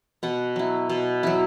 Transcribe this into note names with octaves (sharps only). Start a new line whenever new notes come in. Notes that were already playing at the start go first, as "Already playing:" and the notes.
B2 F#5
F#3 E4
B2
F#3 E4